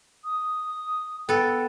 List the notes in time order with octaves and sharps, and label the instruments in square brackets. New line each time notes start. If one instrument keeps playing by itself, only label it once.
[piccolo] D#6
[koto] B3 A4 [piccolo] G5